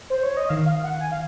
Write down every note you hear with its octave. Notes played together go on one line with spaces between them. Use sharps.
C5
C#5
D#5
D#3 F5
F5
F#5
G#5
F5